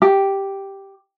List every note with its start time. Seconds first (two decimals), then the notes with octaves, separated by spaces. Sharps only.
0.02 G4